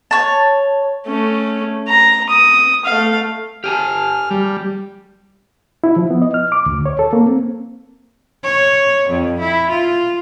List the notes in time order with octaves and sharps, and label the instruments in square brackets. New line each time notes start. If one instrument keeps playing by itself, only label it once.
[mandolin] C#5 A5
[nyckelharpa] A3 C#4
A#5
D#6
A3 F5
[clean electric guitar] G4 G#5 A5 [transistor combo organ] F6
[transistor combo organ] G3
[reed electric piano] E4
F3
B3
D#5
F6
D6
D2
C#5
A4
A#3
C4
[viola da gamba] C#5
F2
E4
F4